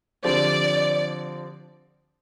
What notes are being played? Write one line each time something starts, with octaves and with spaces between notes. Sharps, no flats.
D3 F3 C4 G4 D5